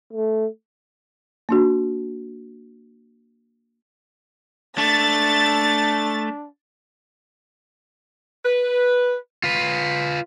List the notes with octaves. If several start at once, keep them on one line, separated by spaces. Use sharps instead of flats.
A3
A#3 D4 F#4
A3 D4 A6
B4
F4 B4